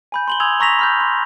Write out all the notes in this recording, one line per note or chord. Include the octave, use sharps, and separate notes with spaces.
G#5 B5 G6
C6 F#7 G7
G#5 C6 D#6 E6 G#6 F7
A#5 C#6 E6 A#6 B6 F7
B5 F6 G6
C6